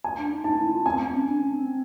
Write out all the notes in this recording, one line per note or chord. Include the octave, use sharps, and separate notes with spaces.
G#5
D4
D#4
D#4 A5
E4
F4
C4 G#5
C4
C#4
D4
C#4
C4